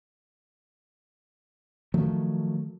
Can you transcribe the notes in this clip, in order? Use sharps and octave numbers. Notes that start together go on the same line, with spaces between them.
D#3 F3 F#3 A3